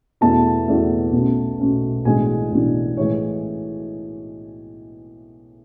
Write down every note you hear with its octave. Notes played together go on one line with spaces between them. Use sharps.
E2 B2 A3 E4 A5
E2 B2 A3 E4
B1 B2 A3 C#4
B1 B2 A3 C#4
B1 A2 E3 G#3 D4 G#5
B1 A2 E3 G#3 D4
A2 E3 G#3 C#5